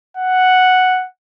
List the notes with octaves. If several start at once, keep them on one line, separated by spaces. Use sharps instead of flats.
F#5